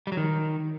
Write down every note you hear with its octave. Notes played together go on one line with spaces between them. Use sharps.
G3
F#3
D#3